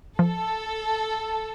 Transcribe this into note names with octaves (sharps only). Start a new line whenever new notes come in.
F3 A4